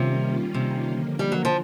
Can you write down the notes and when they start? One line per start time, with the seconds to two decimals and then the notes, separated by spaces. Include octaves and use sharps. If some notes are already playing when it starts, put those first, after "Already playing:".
Already playing: C3 D#3 G3 A#3 C#4 F4
0.54 C3
0.87 D3 F3 A#3
1.19 G3
1.32 F#3
1.45 F3